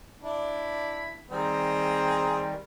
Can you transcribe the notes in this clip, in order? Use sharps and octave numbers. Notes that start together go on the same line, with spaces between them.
D4 E4
D#3 G3 C4 G#4 A#5